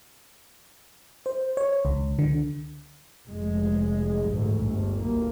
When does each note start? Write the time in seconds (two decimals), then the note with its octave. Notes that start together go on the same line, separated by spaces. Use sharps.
1.26 C5
1.57 C#5
1.85 C#2
2.19 D3
3.26 F1 G#3
4.29 A1 D2 G#2
4.62 G1
4.98 G1 D2 A#3